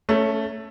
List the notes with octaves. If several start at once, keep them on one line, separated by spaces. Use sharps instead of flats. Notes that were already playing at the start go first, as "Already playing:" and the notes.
A3 C#4